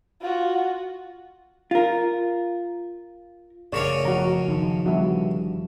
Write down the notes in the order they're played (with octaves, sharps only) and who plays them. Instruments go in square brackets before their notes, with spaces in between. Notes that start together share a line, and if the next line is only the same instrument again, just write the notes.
[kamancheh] F4 F#4
[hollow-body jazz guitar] F4 A#4
[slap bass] A1 F#2 [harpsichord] C#3 A#4 C#5 [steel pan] D5 C#6 D6
[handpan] F3 [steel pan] F#4 A#5
[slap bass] F#1 A2 F3 [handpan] D#3 D#4
[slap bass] G1 E3 D4 [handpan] F3 G3 B3 [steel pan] F#4 E5